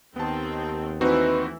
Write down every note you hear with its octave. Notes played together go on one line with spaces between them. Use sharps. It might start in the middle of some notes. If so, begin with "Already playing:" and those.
D#2 D#3 B3 C4 G5 A5
E3 A3 C4 D#4 E4 F#4 B4